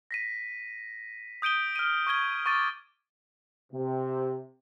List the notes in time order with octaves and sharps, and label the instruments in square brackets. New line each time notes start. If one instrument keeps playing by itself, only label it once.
[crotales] A#6 B6 D#7
D#6 G6 D7 D#7 G7
F6 D#7
C#6 F6 G6 G#6 G7
C#6 D6 F6 A6 D#7
[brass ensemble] C3